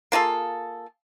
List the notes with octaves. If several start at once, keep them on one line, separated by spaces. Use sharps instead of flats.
A#3 F4 G#4 A4